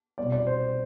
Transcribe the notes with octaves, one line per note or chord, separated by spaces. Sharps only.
C2 B2 D5
D5
C5